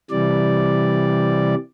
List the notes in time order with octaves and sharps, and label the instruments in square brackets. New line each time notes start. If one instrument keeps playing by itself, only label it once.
[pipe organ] C3 E3 G3 D5